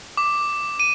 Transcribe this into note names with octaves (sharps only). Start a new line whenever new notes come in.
D6
D#7